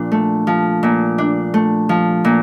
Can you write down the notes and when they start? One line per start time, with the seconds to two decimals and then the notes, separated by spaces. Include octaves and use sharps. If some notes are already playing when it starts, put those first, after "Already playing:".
Already playing: A#2 F3 D4
0.12 A3
0.47 F3
0.83 A#2
1.18 D4
1.54 A3
1.89 F3
2.24 A#2